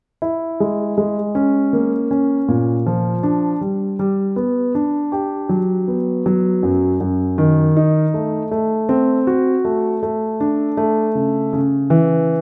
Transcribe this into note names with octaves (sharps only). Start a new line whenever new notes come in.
E4
G#3
G#3
C#4
A#3
C#4
A#2
F3
D4
G3
G3
B3
D4
G4
F#3
B3
F#3
F#2
F#2
D#3
D#4
A3
A3
C4
F#4
A3
A3
D4
A3
C#3
C#3
E3